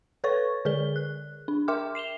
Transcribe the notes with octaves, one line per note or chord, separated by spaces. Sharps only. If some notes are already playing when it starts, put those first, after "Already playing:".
A4 B4 C#5 C#6 A6
D3 G#4 A#4 D5 G7
F#6
D4
A#4 E5 G5 C6 D6 F6
C7 E7 F7 G7